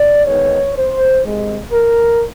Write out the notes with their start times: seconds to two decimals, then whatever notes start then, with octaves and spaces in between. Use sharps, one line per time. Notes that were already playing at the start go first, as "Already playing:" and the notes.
Already playing: D5
0.25 D#3 G#3 B3 D#4 C#5
0.75 C5
1.23 C3 D#3 G#3
1.71 A#4